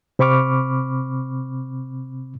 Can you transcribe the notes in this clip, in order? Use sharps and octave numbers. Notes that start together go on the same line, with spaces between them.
C3 C4 B5 C#6 D6 F6